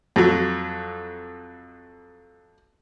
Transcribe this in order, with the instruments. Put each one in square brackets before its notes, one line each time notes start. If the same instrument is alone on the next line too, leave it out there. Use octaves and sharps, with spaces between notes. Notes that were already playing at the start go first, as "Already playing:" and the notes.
[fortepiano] F2 F#3